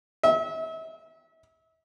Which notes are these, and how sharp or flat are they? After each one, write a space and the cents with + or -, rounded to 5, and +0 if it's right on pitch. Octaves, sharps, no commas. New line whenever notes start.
E5 -35